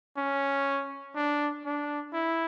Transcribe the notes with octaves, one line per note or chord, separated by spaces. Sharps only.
C#4
D4
D4
E4